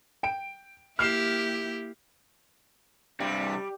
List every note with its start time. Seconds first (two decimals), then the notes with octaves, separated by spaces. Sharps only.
0.23 G5 D7
0.99 A#3 E4 G4 F6 C7 E7
3.20 G2 C3 G3